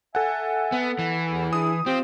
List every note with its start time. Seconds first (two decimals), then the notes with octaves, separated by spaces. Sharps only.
0.15 A4 E5 F#5 G#5
0.72 B3
0.99 E3
1.31 E2
1.53 D4 E4 G#4 D#6
1.86 C4 F4 G4